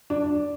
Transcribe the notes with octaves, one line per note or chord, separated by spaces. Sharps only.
D4